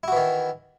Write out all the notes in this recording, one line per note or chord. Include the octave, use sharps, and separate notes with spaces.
D#3 E3 E4 F#4